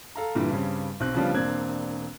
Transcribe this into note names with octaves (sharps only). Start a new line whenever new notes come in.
A4 F5 A#5
G2 A#2 D3 E3 G3
G2 C#3 G3 C4 C#4
B1 C4 F#6
C#3 F3 G3 B3 D4 F4
E1 A#3 C4 D4 F#6 G#6